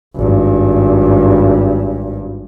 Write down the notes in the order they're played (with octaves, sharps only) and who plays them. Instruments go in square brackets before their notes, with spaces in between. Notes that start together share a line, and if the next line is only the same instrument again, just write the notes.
[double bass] G#1 G2